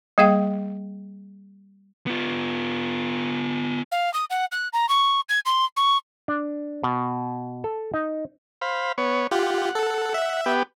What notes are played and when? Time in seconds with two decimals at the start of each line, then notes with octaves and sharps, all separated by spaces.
0.18 G3 A#3 G#4 F5 G5
2.07 B3 F4
3.92 F5
4.14 D#6
4.30 F#5
4.52 F#6
4.73 A#5
4.89 C#6
5.29 G#6
5.45 C6
5.77 C#6
6.28 D4
6.83 B2
7.64 A4
7.94 D#4
8.62 C5 F5 B5
8.98 B3 C#5
9.31 F4 G4 F#5
9.75 A4
10.14 E5
10.46 B3 G4